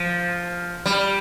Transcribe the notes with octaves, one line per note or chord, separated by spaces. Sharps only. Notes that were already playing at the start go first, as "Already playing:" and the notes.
Already playing: F3
G3